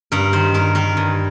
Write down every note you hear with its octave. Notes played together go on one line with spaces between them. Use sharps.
G2 A#4
D#3 C5
G2 A#4
D#3 A#4
G2